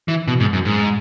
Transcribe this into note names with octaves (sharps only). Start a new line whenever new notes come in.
E3
B2
G#2
F#2
G#2